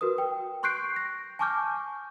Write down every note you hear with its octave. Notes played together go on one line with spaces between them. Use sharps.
F#4 A#4 B4 D#6
G5
C6 C#6 F#6 G6 C7 D7
A#6
G#5 A5 C#6 D6 F6 G6